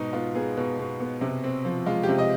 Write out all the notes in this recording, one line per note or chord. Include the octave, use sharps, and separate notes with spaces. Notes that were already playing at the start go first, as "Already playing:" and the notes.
Already playing: G#2 B2 D#4
B3 F4
B3 G#4
B2
B2
B3
C3
C4
F3
G#3 F4
G4
C3
D#5